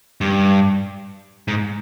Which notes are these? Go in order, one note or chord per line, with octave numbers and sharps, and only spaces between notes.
G2
G#2